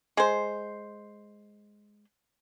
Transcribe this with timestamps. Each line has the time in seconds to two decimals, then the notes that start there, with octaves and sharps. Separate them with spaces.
0.17 G#3 C5